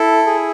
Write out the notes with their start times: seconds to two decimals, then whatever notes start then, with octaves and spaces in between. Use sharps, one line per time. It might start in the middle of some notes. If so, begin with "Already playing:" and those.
Already playing: E4 A4
0.26 G#4